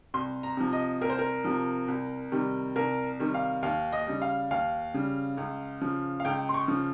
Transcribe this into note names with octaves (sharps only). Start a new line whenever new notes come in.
C2 C6
A#5
C3 F3
D#5
C2 A#4
C5
A#4
C3 F3
C2
C3 D#3 G3
C2 A#4
C3 D#3 G3
F5
D#2 F5
D#5
C#3 G3
F5
D#2 F5
C#3 G3
C#2
C#3 F3
F5
C#2 G5
C6
C#6
C#3 F3